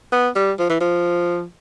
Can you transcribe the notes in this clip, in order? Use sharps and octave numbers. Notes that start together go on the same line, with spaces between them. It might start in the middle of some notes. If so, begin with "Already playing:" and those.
B3
G3
F3
E3
F3